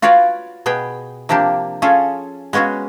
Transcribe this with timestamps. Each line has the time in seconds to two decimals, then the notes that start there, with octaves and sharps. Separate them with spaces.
0.02 F4 F#4 B4 C#5 D5
0.66 B2 B3 G#4 G5
1.29 C3 F3 A#3 D4 G4
1.82 C#4 F4 G#4 A4
2.53 G#3 B3 C#4 F#4 G#4